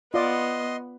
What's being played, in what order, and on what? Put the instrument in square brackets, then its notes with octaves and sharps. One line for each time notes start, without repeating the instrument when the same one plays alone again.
[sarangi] B3 [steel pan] F4 D5 [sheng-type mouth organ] D#5 C6